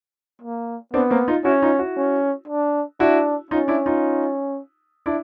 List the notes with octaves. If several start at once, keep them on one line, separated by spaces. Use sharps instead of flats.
A#3
B3 C4 D4
A#3 C4
D#4 F4
C#4 E4 F#4
D#4 F4
E4 F#4
C#4
D4
D4 E4 F#4
C#4 D#4 F4
D4 E4
D#4 F4
D4 E4